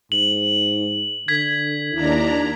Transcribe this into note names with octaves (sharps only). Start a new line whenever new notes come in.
G#2 F#7
D3 G#6 B6
D#2 D4 E4 A#5